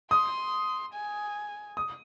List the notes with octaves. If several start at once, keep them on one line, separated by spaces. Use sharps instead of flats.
C6 D#6
G#5
D#6